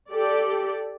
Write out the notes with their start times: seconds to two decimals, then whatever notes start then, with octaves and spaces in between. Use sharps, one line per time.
0.10 G4 A4 D5